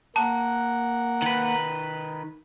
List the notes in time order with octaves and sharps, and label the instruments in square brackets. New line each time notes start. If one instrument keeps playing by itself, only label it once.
[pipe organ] A#3 A#4 F#5 [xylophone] A5
[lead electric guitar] D#3 B4